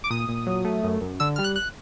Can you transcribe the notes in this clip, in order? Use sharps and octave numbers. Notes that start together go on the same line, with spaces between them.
D6
A#2 D#6
A#2
F#3
A3
F#2
F#2
D3 E6
G3 F6
F#6
F#6